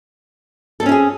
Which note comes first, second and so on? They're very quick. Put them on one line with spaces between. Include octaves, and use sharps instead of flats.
A4 C4 C#4 E4 G#4